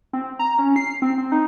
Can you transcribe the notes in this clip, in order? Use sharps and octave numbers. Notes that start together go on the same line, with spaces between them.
C4
A#5
C#4
C7
C4
C4
D#4